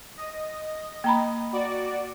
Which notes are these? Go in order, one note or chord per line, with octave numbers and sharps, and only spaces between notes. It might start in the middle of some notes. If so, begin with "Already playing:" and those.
D#5
A#3 A#5 B5
F#4 D5